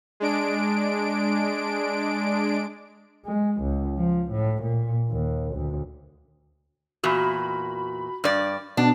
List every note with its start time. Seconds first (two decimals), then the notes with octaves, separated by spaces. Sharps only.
0.20 G#3 D4 D7
3.26 G#3
3.61 C#2
3.98 F3
4.31 A2
4.62 A#2
5.10 D#2
5.55 D2
7.03 E2 A#2 F#4 B5
8.24 G2 D5
8.77 B2 B3 D4